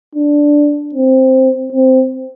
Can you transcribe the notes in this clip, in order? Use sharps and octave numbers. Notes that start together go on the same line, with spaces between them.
D4
C4
C4